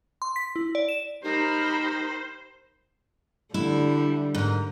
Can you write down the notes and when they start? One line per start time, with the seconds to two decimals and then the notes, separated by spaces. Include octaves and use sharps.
0.22 C6
0.36 B6
0.56 E4
0.75 D5
0.89 E7
1.24 D#4 G4 A#4 C5 B5
3.54 D3 G3 E4
4.35 G#2 A#4